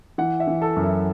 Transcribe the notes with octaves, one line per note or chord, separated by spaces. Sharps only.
E3 F#5
E5
E3
A4
F#2
E4